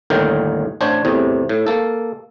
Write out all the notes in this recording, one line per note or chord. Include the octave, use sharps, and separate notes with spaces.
G1 D#2 A2 D#3 A#4 G5
A1 D4 C5 C#5
E2 A2 C3
A2
A#3 A4